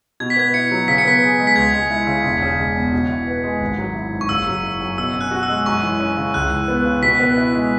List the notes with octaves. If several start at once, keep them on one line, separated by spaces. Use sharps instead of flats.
B2 G#6
B6
B3 G#6
E4 C#7
F#3
C#3 B6
C#7
B3 B6
G#4
G#3
B6
C#2 G#6
G#3
E4
C#3
E1
C#3
G#3
E2
B2
E4
B4
G#3
G#1
F#3
E4
G#2
C#6
F#1 E6
F#3
E4
F#2
B2 E6
C#4
F#6
F#4
E6
G#3
F#2 C#6
E3
C#4
C#3
C#2 F#6
E3
B3
C#3
B2 B6
B3
E4
G#3